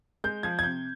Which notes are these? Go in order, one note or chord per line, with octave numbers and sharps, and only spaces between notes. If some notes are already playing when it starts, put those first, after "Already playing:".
G#3 G6
F3 G#6
G#6
C3 G6